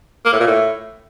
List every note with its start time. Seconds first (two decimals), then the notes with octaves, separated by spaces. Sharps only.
0.25 A#3
0.32 A2
0.40 A#2
0.47 A2